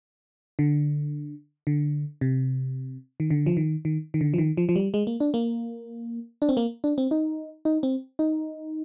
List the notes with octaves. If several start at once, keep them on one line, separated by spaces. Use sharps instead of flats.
D3
D3
C3
D#3
D3
F3
D#3
D#3
D#3
D3
F3
D#3
F3
F3
G3
G#3
A#3
D4
A#3
D4
C4
A#3
D4
C4
D#4
D#4
C4
D#4